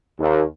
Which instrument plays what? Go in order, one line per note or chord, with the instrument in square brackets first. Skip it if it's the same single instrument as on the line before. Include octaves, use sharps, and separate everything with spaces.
[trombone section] D#2